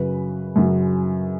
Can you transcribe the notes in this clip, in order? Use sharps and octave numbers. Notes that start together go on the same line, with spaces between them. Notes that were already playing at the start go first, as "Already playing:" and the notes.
Already playing: F#2 C#3 F#3 B4
F#2 C#3 F#3